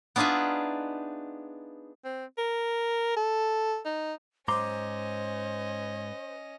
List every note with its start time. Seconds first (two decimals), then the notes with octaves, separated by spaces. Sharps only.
0.16 B3 D4 D#4 F4 G#4 E5
2.04 C4
2.38 A#4
3.17 A4
3.85 D#4
4.48 G#2 C#4 C5 D#5 A#5 C6 D6